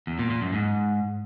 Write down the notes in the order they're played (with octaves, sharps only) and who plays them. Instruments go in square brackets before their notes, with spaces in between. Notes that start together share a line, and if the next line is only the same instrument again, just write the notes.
[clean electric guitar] E2
A#2
A#2
F#2
G#2